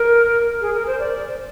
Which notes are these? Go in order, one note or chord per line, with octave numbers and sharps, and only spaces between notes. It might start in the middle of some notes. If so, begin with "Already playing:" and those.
Already playing: A#4
G#4
A#4
C5
D5